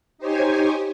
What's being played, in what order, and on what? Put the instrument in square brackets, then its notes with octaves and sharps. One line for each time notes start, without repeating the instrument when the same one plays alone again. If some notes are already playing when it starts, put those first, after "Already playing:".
[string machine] D#4 G4 C5 C#5 G#5